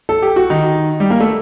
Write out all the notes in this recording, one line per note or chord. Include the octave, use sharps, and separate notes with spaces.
A4
G4
F#4
D#3 D#4
G3 G4
A#3 A#4
A3 A4